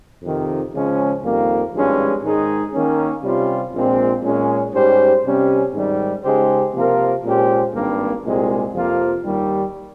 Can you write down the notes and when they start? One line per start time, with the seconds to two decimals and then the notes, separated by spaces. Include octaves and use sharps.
0.23 F2 C3 D#3
0.74 C#3 F3 G#3 C#4
1.23 F2 D#3 G3 A#3
1.73 G#1 G2 F3 G#3 C#4
2.24 G#2 D#3 G#3 D#4 G#4
2.74 D#3 A#3 C#4
3.24 C3 G3 C#4 F4
3.74 A#1 A#2 G#3 C4
4.23 A#2 G#3 C#4
4.74 G#2 G3 C#4 G4 C5
5.24 C3 G3 C#4
5.74 G#2 D#3 G3
6.24 C#3 G#3 D#4 G4 C5
6.74 C3 F3 A#3 F4 A#4
7.24 A#2 G#3 C#4 G4 C5
7.74 G#1 G2 G3 A#3
8.24 C2 A#2 G#3 C4
8.74 F2 C3 F3 A#3 F4
9.24 D#2 D#3 G3